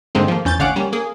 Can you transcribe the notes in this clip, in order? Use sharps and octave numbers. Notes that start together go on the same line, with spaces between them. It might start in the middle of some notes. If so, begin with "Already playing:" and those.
G#2 D3 D#3 G#3 A#3 C4
F3 A#3
E2 C#4 G6 A6
A1 D3 C#4 F5 F#5 D6
G3 A#3 C#4
A#3 G#4